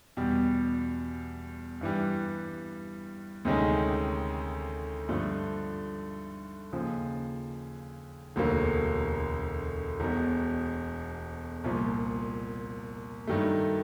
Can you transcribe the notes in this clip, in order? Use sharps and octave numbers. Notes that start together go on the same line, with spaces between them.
E2 B2 G3
G2 E3 G3
D2 C3 D#3 G#3 C#4
G2 D3 F3 A3
D#2 C#3 F3
E1 D2 D3 F#3 A#3
E1 E2 B2
C2 A#2 F3
G2 D#3 F#3 A3